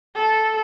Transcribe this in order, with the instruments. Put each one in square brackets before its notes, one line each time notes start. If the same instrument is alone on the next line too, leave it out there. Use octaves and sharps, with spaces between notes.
[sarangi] A4